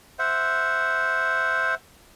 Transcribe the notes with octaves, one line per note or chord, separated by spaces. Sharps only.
C5 E5 F#5